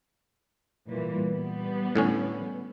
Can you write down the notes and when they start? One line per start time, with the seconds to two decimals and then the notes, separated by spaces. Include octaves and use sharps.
0.89 A#2 E3 G3
1.28 G3 B3
1.95 A2 D3 C#4